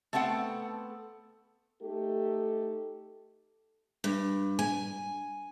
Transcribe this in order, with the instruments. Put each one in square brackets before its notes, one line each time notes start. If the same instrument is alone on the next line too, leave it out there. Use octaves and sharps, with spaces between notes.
[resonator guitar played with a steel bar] A3 B3 C4 A4 F#5
[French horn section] A3 D#4 G4 A4
[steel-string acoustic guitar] G2
G#5